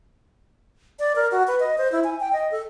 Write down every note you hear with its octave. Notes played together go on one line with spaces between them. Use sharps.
D5
A#4
F#4
B4
D#5
C5
E4
G#5
G5
D#5
A4